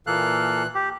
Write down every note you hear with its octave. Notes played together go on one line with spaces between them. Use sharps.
A#2 E3 A#3 A4 F5 F#6
G4